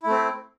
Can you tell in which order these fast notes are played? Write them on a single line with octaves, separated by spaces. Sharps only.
E4 A3 C4